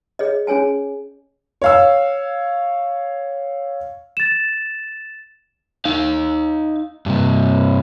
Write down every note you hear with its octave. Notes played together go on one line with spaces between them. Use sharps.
G#4 C#5 D#5
C#4 G#4 C#5 G#5 A5
C#5 F5 E6
A6 E7
D#4 F5
G2 C3